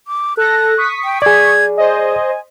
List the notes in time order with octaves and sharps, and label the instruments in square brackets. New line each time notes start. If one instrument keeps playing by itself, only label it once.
[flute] D6
[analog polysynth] A4 A#6 [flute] F#6
[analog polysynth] C#6 D#6 B6
[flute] G5
[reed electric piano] G#4 D5 [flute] G#6
[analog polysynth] C5 D#5 [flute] G#5